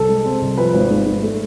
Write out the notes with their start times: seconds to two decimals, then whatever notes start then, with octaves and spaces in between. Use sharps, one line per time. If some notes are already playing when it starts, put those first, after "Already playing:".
Already playing: C2 A4
0.08 G#3
0.25 C4
0.41 C2
0.58 F3 B4
0.74 G#1
0.91 G#2
1.06 G#2
1.22 A3